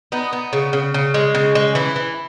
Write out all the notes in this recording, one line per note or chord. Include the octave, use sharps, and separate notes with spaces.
B3 D#4
B3
C#3
C#3
C#3
G#3
C#3
G#3
E3 E4
E3